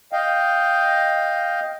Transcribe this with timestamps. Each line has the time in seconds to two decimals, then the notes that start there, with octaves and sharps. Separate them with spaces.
0.13 D#5 F5 G5